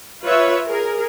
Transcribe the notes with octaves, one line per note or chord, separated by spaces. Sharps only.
F4 B4 C#5 E5
G#4 A#4